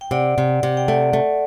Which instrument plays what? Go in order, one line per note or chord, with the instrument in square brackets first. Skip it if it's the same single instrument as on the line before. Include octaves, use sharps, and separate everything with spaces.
[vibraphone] G5
[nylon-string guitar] C3 [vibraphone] D5 F#5
[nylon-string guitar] C3
C3
[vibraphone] G5
[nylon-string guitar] A3 [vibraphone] D5 F#5
[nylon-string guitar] A3